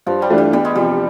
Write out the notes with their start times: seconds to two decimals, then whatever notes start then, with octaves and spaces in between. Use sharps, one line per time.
0.06 G2 F3
0.22 G3
0.30 E3 A3 D4 F4
0.38 G3
0.52 E2 G3
0.65 G#3
0.75 C3 F3 G3